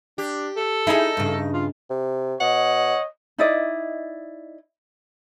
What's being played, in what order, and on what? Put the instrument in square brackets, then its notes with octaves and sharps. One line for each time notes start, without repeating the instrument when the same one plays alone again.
[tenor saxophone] D4 [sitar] G4
[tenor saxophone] A4
[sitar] D#4 [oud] E4 G#4
[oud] G2 C#3
[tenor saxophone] F4
[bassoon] C3
[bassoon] B2 [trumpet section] C#5 D#5 [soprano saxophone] F#5
[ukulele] D#4 E4 D5 D#5